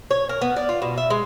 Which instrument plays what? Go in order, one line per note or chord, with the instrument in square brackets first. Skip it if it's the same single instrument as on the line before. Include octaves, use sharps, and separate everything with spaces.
[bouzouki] C#5
A#4
B3
D5
F4
B2
E5
G#3